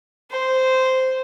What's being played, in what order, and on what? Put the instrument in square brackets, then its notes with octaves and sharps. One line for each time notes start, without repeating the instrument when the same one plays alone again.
[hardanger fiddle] C5